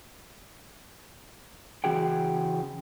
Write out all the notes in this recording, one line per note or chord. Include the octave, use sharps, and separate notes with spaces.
C#3 E3 F#4 G#4 G5